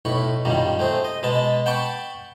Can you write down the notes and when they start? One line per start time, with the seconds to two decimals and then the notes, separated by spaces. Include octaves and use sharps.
0.05 B1 A2 B5 C#6
0.45 F#2 A#2 D#3 G3
0.79 A3 C4 G#4
1.04 D#5
1.23 B2 G#3 B3 A5
1.66 F#5 G5 A5 B5 C#6 D6